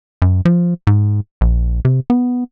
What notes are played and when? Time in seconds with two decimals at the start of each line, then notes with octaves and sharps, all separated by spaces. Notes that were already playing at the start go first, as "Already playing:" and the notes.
0.22 F#2
0.45 F3
0.87 G#2
1.41 A#1
1.85 C3
2.10 B3